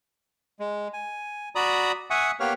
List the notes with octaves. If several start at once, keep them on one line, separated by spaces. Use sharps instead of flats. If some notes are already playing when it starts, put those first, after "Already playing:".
G#3
G#5
F#4 D5 A#5 B5 D#6
E5 F#5 G#5 C#6 D#6
A#3 B3 G4 B4 C#5 F6